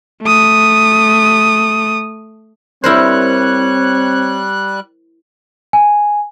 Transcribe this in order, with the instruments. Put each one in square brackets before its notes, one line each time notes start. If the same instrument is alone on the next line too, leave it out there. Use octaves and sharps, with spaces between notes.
[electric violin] A3 D#6
[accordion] G3 F#6 [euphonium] C4 [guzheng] E4 A#4 C5 [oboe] C#5
[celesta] G#5